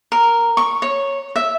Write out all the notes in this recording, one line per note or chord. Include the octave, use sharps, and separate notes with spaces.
A#4
C#6
C#5
E5